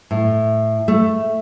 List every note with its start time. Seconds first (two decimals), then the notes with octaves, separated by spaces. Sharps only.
0.11 A2
0.88 A3